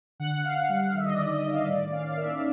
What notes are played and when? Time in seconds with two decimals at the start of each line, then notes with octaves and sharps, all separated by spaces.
0.19 D3 F#5
0.44 D3 F5
0.69 G3
0.81 F#5
0.89 F5
0.94 D#3 E5
1.04 D#5
1.13 D5
1.18 D#3
1.31 D#5
1.43 D#3
1.49 F5
1.67 A2 D5
1.92 C#4 F5
2.16 A#3 E5